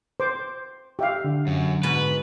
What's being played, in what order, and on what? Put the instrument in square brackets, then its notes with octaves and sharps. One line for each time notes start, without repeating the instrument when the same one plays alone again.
[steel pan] C5 D6
G4 E5 F5
[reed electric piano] D3
[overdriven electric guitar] F#2
[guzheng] G#2 B2 [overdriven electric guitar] B4